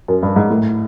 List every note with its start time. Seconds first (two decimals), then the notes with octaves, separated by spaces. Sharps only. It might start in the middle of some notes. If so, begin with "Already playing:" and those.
0.08 F#2
0.23 G2
0.36 G#2
0.50 A2